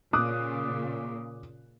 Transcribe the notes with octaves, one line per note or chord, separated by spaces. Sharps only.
A#2 C#3 D6 D#6 F#6